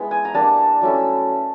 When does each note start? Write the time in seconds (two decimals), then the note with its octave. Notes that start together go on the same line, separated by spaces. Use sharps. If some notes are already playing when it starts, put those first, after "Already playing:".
Already playing: G#3 B3 E4
0.11 G#5
0.25 A#5
0.34 G3 A#3 D4 A5
0.82 F#3 A3 C#4 E4